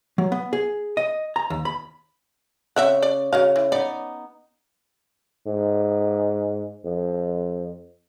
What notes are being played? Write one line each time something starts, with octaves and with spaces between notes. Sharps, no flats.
F#3
B3
G#4
D#5
A#5
D#2
B5
C#3 C4 E5 F#5
D5
C#3 F#3 D#5 F5
E3
B3 D#4 D5
G#2
F2